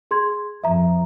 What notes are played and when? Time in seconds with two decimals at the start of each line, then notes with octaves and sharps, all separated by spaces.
0.11 G#4 C6 G#6
0.64 F2 F3 E5 A#5